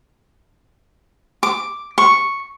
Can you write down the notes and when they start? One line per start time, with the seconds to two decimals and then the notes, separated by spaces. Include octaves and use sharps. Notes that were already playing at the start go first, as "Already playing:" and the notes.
1.43 D6
1.98 C#6